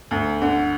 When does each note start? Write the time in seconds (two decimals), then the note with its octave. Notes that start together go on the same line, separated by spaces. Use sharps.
0.11 D2
0.42 D3